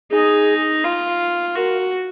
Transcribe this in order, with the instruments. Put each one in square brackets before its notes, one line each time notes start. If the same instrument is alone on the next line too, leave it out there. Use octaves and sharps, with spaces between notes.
[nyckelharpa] D#4 [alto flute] G#4
[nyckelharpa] F4
[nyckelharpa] F#4 [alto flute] A#4